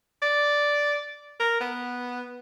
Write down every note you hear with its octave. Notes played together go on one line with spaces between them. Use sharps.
D5
A#4
B3